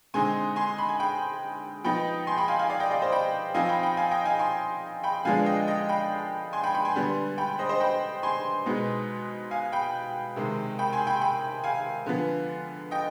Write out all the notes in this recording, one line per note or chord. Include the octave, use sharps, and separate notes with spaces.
D3 G#3 C4 D#4 G#5 C6
G#5 C6
B5
G#5
G5 B5
F3 B3 D#4 G5 B5
G#5 C6
G5 B5
F5 G#5
F5 G#5
D5 F5
D#5 G5
D5 F5
C5 D#5
G5 B5
F3 C4 D#4 F5 G#5
G5 B5
G5 B5
F5 G#5
D#5 G5
F5 G#5
G#5 C6
G5 B5
D3 F3 G#3 B3 D4 F5 G#5
D#5 G5
D#5 G5
G5 B5
G#5 C6
G5 B5
G5 B5
G#5 C6
D3 G3 B3
G5 B5
C5 D#5
C5 D#5
G5 B5
G#5 C6
B2 G#3 B3 D#4
F5 G#5
G5 B5
C3 D#3 G#3
G5 B5
G#5 C6
G5 B5
G5 B5
F5 G#5
D3 F3 B3
D#5 G5